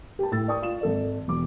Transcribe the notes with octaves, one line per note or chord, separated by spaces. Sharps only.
G4 G5 A5
A2 E6 A6
D5 G5 C#6 D#6
F4 E7
G#1 A4 D5
E1 D6